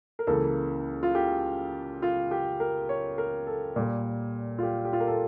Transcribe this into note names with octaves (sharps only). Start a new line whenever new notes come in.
A#4
C#2 C#3 E3 A#3 A4
F4
G4
F4
G4
A#4
C#5
A#4
A4
A#2 G3 A#3
F4
G4
G4
F4
A#4
A4